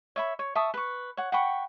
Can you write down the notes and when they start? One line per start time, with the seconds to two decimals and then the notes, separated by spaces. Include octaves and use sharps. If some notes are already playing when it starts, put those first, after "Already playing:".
0.16 C#5 E5 B5
0.39 C#5
0.55 E5 A5 C#6 D#6
0.74 B4 C#6
1.17 C#5 F#5
1.32 F#5 G5 B5 C#6